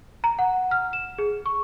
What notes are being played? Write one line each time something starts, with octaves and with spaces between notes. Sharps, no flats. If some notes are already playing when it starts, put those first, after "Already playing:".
A#5
F#5
F6
E7
G#4
C#6